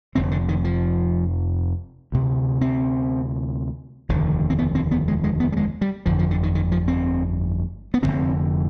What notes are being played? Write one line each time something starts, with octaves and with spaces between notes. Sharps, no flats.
F1 F2 D3 C4
D3
D#3
F3
D2 C3
C4
F1 D#2 D3
C4
B3
C4
B3
G#3
G#3
B3
G3
G#3
G3
G1 F2 D3 F3
F3
D3
D#3
D#3
F3
C4
B3
F1 D#2 D3 C4